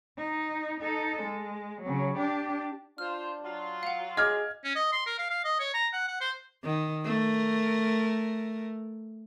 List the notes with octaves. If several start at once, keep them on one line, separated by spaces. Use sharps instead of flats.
D#4
D#4 A4
G#3
C#3 F#3
D4 G4
D4 F4 C5 F6
F#3 F4
F5 F#5
G#4 D#5 D6 F6 G#6
C#4
D#5
C6
A#4
F5
F5
D#5
C#5
A#5
F#5
F#5
C5
D#3
A3 A#4